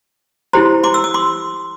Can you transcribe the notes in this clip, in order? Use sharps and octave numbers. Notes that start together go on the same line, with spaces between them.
E4 G4 C5 A#5 C6
C6 D6
E6
D#6
C6 D6